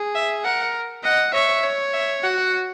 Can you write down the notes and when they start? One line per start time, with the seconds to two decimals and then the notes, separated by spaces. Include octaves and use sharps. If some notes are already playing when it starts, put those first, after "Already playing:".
Already playing: G#4
0.15 E5
0.44 A#4 F#5
1.04 D#5 F#5
1.34 C#5 E5
1.64 C#5
1.94 E5
2.23 F#4 F#5